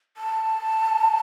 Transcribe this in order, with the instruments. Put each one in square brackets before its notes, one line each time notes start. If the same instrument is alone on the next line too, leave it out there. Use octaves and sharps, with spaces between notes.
[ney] A5